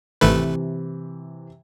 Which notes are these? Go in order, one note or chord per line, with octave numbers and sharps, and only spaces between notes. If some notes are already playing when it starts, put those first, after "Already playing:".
G#1 C3 E3 A3 B4